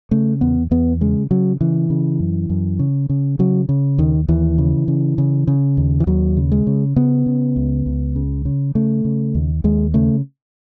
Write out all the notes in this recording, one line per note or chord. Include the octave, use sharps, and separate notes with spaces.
C#3 A3
E2 B3
E2 B3
C#3 G#3
C#3 F#3
C#3 E3
C#3
F#2
F#2
C#3
C#3
C#3 F#3
C#3
D#2 D#3
D#2 E3
C#3
C#3
C#3
C#3
D#2
E3
D#2 F#3
C#3
G#3
C#3
C#3 B3
C#3
C#2
C#2
C#3
C#3
C#3 A3
C#3
D#2
D#2 G#3
C#3 A3